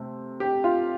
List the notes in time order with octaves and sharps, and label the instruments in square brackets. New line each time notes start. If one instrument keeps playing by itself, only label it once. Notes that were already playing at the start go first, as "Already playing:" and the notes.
Already playing: [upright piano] C3 A3
G4
F4